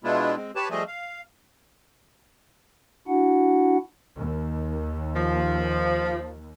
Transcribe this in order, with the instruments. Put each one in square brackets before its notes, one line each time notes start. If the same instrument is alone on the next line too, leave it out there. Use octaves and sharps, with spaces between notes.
[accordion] B2 G#3 B3 D4 E4 F4
G#3 C4
G4 B4 C#5 A5
F3 G3 A3 G#4 D#5
F5
[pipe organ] D4 E4 F#4 F#5
[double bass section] D#2
[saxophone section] F3